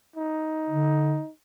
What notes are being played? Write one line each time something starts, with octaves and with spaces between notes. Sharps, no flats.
D#4
D3